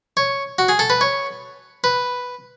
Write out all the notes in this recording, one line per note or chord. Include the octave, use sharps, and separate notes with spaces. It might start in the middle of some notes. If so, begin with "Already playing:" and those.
C#5
F#4
G#4
A4
B4
C#5
B4